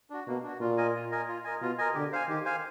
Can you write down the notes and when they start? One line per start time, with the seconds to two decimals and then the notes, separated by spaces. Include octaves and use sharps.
0.10 D4 F#4
0.27 B2 A#3
0.43 D4 F#4
0.60 A#2 F4
0.77 A#4 D#5 G#5
0.95 F4
1.11 A#4 D#5 G#5
1.28 F4
1.44 A#4 D#5 G#5
1.61 B2 F4
1.78 A#4 D#5 G#5
1.94 D3 G4
2.12 C5 F5 G#5
2.29 D#3 G4
2.45 C5 F5 G#5